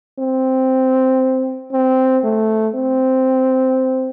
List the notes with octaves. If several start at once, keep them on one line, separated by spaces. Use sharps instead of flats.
C4
C4
A3
C4